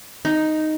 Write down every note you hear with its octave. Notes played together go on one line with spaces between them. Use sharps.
D#4